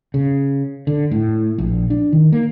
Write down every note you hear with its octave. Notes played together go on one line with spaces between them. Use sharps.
C#3
D3
A2
A#1
D4
D#3
A#3